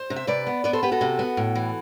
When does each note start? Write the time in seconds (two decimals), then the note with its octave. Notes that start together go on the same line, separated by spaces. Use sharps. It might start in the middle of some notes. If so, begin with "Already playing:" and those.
Already playing: C5
0.10 C3
0.16 E5
0.27 C3 B4 D5
0.47 B3
0.64 B3 B4 D5
0.73 A4 C5
0.82 B3 G4 B4
0.92 F#4 A4
1.01 C3
1.19 B3
1.37 A2
1.55 E3